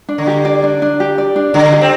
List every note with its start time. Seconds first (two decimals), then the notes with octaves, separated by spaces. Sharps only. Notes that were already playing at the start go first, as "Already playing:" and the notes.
0.09 D4
0.18 D3
0.27 G4
0.45 D5
0.64 D4
0.82 D4
1.00 G4
1.18 D5
1.36 D4
1.54 D3 D4
1.73 G4
1.81 C4